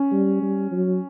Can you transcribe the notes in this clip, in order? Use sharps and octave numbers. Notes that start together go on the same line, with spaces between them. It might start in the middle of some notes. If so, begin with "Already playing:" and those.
Already playing: C#4
G3
G3
F#3